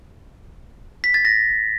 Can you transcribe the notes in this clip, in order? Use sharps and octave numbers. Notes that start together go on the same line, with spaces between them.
B6
A6
A#6